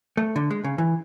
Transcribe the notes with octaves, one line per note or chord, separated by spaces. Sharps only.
A3
D3
G#3
C#3
E3